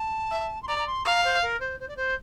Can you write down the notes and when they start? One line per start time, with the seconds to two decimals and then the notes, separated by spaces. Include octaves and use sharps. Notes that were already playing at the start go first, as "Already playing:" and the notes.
Already playing: A5
0.31 E5
0.62 C6
0.67 D5 A#5
0.78 A#5
0.86 C6
1.05 F5 A#5
1.24 C5
1.42 A#4
1.60 C5
1.80 C5
1.88 D5
1.96 C5